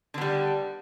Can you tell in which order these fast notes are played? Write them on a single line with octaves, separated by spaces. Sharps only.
D3 B3 G3